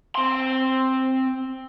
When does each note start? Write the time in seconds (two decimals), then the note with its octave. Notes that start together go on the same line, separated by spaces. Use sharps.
0.15 C4 C6